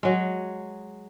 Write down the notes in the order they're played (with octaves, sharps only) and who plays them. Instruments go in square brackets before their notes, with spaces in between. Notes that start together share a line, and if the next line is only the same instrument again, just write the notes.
[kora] F#3 G#3